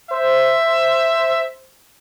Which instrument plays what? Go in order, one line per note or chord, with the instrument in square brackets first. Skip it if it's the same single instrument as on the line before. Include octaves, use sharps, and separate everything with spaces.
[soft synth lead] C5 [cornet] E5